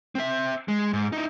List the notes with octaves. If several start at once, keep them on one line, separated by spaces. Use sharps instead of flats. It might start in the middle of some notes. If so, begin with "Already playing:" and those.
C4 E5
G#3
G#2
D#4 E4